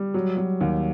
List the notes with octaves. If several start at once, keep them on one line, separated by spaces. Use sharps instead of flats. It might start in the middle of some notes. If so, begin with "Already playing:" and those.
Already playing: G3
F#3
F#3
D#2